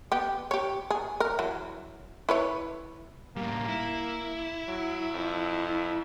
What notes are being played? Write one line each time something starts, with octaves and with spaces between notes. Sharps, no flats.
B3 G4
G4 C#5
G#4
A#4
E3 F#3
E4 B4 C#5
A2 G3 A#3
E4
F#3
F2